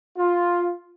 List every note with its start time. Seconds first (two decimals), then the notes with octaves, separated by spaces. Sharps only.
0.17 F4